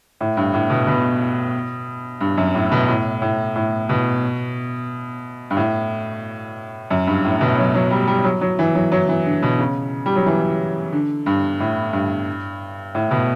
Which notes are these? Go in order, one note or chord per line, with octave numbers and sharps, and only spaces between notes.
A2
G2
A2
B2
B2
G2
F#2
A2
B2
A2
A2
A2
B2
G2
A2
F#2
G2
A2
B2
F#3
F#3
G3
G3
F#3
F#3
E3
F#3
F#3
E3
D3
B2
C#3
G3
F#3
E3
D3
G2
A2
G2
A2
B2